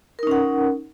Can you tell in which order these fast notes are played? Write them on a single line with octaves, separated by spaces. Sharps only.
A#4 D#4 C#4 F#5